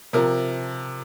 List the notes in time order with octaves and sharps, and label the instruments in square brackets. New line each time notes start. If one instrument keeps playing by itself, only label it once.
[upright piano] C3 F3 A#4